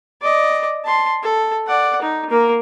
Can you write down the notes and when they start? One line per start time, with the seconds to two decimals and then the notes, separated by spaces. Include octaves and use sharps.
0.22 D5 D#5
0.85 A5 C6
1.23 A4
1.67 D5 F#5
2.02 D#4
2.30 A#3 A#4